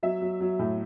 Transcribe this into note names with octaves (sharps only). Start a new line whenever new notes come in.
F#3 E5
F#3
F#3
A2